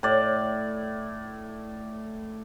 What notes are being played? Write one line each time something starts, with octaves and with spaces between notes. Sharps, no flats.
A2 D5